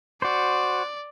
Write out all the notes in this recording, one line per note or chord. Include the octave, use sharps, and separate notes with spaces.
F#4 C5 D5